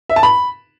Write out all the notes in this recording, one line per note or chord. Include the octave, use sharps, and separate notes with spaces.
E5
A5
B5